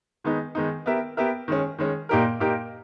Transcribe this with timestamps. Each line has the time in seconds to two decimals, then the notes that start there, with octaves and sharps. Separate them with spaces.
0.24 D#3 G#3 B3 D#4
0.55 D#3 G#3 B3 D#4
0.86 B3 G4 A#4 E5
1.17 B3 G4 A#4 E5
1.48 D#3 G#3 C#4
1.78 D#3 G#3 C#4
2.09 A#2 A#3 D#4 G4 A#4
2.40 A#2 A#3 D#4 G4 A#4